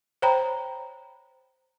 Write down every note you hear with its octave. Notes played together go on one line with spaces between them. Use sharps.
C5 C#5 G5 A#5 B5